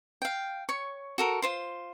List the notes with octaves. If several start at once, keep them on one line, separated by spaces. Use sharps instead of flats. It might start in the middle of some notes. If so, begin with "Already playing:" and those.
F5 G5
C#5 C#6
F#4 A4 A#4
F4 C5 C6